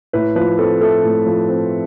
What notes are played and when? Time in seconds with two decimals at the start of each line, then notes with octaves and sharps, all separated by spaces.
0.13 A2 B4
0.36 F3 B4
0.59 C4 A4
0.81 A3 A4
1.03 A2
1.26 F3
1.48 C4